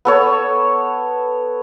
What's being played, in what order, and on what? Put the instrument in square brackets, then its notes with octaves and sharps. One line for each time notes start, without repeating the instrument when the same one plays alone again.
[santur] B3 A4 C#5